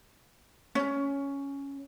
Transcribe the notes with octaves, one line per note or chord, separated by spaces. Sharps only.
C#4